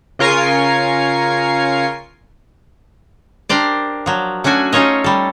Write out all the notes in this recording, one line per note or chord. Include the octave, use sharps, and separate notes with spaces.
C#3 F4 A#4 G#5 C#6 C7
D4 G4 A#4 C5 D5
F3 F#3
A3 C#4 D4 F#4 G#5
A3 C#4 D#4 F4 C#5 D#5
G3 A4